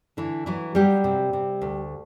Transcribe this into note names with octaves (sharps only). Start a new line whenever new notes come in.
D3 E3 E4
E3 F#3 E4
F#3 G3 G4
C3
C3
D2